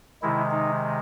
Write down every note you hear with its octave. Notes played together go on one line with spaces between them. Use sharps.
C3 D#3 G#3 E4
D#4